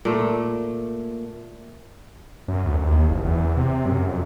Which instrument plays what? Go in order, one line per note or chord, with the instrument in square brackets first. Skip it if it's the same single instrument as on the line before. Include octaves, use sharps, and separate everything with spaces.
[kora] A#2 A3
[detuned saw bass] F#2
D2
D#2
F#1
E2
C3
F#2
F2